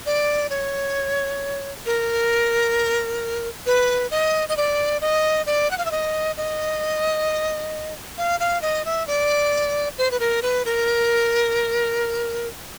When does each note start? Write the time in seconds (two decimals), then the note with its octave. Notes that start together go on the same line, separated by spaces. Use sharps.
0.06 D5
0.50 C#5
1.86 A#4
3.66 B4
4.11 D#5
4.49 D#5
4.57 D5
5.01 D#5
5.46 D5
5.71 F#5
5.78 F5
5.85 E5
5.91 D#5
6.37 D#5
8.18 F5
8.40 F5
8.62 D#5
8.85 E5
9.07 D5
9.98 C5
10.11 B4
10.20 A#4
10.42 B4
10.65 A#4